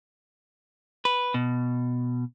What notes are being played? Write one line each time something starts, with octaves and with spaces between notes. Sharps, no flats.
B4
B2